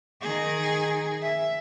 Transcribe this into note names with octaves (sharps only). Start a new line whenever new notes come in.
D#3 G#4
E5